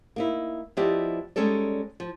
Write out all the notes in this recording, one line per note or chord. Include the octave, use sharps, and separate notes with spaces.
A#3 D#4 E4
F3 B3 E4 G4 D5 D#5
G3 G#3 C#4 D#4 A4 D5
F3